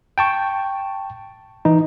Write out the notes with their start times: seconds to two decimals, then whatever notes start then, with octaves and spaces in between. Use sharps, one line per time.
0.18 G5 A5 C#6
1.65 E3 D#4